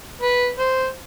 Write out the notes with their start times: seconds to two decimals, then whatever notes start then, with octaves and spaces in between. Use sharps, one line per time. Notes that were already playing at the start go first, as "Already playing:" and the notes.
0.21 B4
0.59 C5